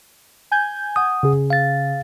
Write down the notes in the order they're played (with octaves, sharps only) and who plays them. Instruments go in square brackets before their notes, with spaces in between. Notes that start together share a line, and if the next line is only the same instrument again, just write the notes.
[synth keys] G#5 G6 G#6
[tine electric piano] F#5 D#6
[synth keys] C#3 G#4
[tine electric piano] F5 A6